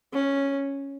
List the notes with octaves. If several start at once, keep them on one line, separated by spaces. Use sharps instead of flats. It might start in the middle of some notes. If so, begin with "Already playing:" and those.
C#4